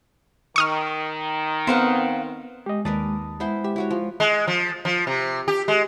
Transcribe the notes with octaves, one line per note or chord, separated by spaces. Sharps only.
D#3 C#6 D#6 F6
B3 C4 B4 C5 F5 F#5
G#3 G4 D#5
D#2 A#4 B4 D5 A5 D#6
G#3 B3 E4 C5
G4 E5
E4 F#4 C#5
F3
G#3
F3
F3
C3
G4
G#3